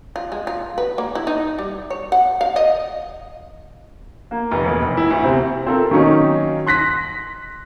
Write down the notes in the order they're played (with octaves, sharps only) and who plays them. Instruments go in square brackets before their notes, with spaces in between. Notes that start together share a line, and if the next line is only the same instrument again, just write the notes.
[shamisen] F4
G#3
F4
B4
A#3
E4
D#4
G3
C#5
F#5
F5
D#5
[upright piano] A#3
F1
E1
F1
E4
D2
C3
C4 F4 A4 A#4
D#3 F#3 A#3 C#4 D#4
C6 F#6 A#6 B6